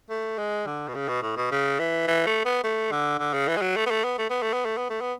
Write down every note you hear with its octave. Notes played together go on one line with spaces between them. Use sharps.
A3
G#3
D3
B2
C#3
B2
A2
B2
C#3
E3
E3
A3
B3
A3
D3
D3
C#3
E3
G#3
F#3
A3
B3
A3
B3
A3
B3
A3
B3
A3
B3
A3
B3